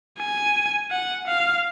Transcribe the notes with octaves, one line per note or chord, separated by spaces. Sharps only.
G#5
F#5
F5